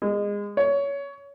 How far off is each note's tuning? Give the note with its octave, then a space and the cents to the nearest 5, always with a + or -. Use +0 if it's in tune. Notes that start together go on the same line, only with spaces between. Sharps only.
G#3 -25
C#5 +20